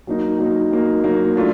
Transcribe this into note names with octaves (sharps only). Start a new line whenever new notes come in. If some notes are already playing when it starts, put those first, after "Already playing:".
F#3 A#3 D#4
F#3 A#3 D#4
F#3 A#3 D#4
F#3 A#3 D#4
F#3 A3 D4 F4